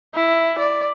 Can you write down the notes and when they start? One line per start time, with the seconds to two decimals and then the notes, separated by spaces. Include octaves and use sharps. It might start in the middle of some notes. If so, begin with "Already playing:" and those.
0.14 E4
0.59 D5